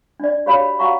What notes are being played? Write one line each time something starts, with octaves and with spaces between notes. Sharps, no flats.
D4 D5
F#4 G4 C#5 F5 B5
F#4 F5 F#5 G#5 A#5 C#6